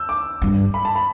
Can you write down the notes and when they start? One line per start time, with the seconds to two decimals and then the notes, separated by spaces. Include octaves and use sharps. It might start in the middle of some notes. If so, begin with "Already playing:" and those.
Already playing: E6 G6
0.09 D6
0.42 G2
0.74 B5
0.85 A5
0.96 B5